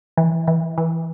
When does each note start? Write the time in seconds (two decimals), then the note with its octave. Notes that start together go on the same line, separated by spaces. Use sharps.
0.17 E3
0.48 E3
0.78 E3